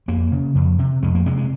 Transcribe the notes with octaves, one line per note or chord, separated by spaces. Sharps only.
F2 A#3
C#3
F2
C3
F2 G#3
A#3
C3 G#3
G#3